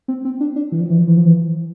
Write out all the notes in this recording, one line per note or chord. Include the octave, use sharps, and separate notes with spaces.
C4
C4
D4
D4
E3
F3
E3
F3
E3
F3
E3